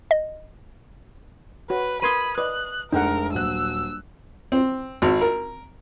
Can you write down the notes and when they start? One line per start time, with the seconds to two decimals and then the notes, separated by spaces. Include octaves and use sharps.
0.11 D#5
1.70 F#4 B4 C#5
2.02 A#4 B4 B5 C6 D#6 G#6 D#7
2.38 B4 D5 D#5 D#6 F#6
2.93 F1 G#3 D4 D#4 A4 A#4 F#5
3.33 D#1 F#3 E6 F#6
4.52 C4
5.02 G#1
5.21 A#4